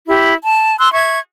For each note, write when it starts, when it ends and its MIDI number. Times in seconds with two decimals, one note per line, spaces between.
0.07 0.33 64
0.07 0.33 67
0.43 0.78 81
0.79 0.91 84
0.79 0.91 88
0.79 0.91 90
0.93 1.18 76
0.93 1.18 85
0.93 1.18 92